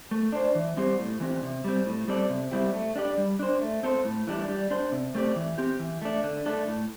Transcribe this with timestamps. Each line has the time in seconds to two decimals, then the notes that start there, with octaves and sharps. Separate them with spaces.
0.11 A3
0.32 D4 C5
0.55 E3
0.77 G3 C4 G4 C5
0.99 A2
1.20 E3 C4 G4
1.43 C3
1.64 G3 C4
1.86 A2
2.08 G3 C4 A4 D5
2.30 C3
2.52 G3 C4 E4 G4
2.73 A3
2.96 D4 G4 D5
3.17 G3
3.39 D4 C5
3.61 A3
3.83 C4 A4 C5
4.05 A2
4.27 E3 G3 D4
4.49 G3
4.70 D4 C5
4.92 C3
5.15 A3 C4 G4 D5
5.36 E3
5.58 C4 G4
5.79 E3
6.02 A3 D4
6.23 D3
6.46 A3 D4 A4
6.67 A2